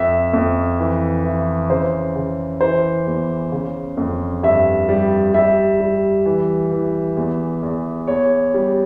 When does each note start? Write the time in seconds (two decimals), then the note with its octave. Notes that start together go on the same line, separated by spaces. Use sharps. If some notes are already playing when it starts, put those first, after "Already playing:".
Already playing: F2 E5
0.33 F2
0.79 E3
1.24 E3
1.70 C#3 C5
2.16 C#3
2.61 E3 C5
3.07 E2
3.52 C#3
3.97 F2
4.43 G2 E5
4.89 G3
5.34 G3 E5
5.80 G3
6.26 E3
6.71 E3
7.17 E2
7.63 E2
8.07 E2 C#5
8.54 G3